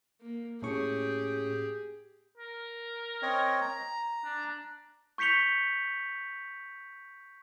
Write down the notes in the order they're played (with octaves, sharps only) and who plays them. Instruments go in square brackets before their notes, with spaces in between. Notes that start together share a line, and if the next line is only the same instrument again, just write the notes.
[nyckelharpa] A#3
[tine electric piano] A2 C#4 C#6 [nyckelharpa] G4 G#4
[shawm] A#4
[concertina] C4 C#5 D#5
A#5
[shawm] D4
[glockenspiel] C#6 G6 B6 C#7 F7 G7